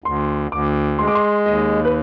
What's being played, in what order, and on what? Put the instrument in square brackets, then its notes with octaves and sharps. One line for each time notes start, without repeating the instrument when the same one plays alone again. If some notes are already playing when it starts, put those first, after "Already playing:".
[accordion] D2 [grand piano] C6
[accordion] D2 [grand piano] D6
[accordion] G#3 [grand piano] C6
[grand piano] D6
C6
[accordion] D#2 [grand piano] D#5
[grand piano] B4